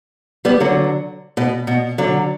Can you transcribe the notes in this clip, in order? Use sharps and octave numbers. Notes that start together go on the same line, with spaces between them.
G3 B3
D3 F#3
B2
B2
D3 F#3